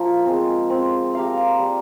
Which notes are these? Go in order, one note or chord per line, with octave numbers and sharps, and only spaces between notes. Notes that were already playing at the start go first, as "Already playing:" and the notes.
Already playing: F3 A#3 F4
G#3 C4
C4
G4 A#4 F5
G3